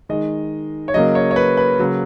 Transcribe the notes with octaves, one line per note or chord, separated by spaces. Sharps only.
D#3 G#3 D#5
C#5
C#3 F#3 A#3 D#5
C#5
C#5
B4
B4
C#3 F#3 A#3